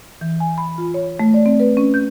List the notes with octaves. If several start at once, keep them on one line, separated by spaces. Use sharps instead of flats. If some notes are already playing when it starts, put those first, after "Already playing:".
E3
G#5
B5
F4
C#5
A3
D5
C4
B4
C#4
G6